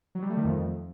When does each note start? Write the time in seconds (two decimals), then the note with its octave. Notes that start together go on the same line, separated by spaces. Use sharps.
0.15 F#3
0.22 G3
0.30 A3
0.37 D#3
0.44 F2